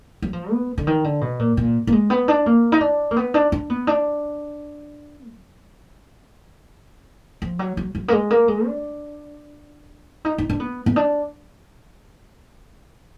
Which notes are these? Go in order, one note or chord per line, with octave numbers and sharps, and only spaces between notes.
F#3
F3
B3
D3
D#3
D3
B2
A#2
A#2
A#3
G#3
B3
D4
A#3
D#4
D4
A#3
B3
D4
D4
B3
D4
F#3
F3
F#3
F#3
F#3
A#3
G#3
A#3
G#3
D4
D#4
D#4
D4
B3
B3
D4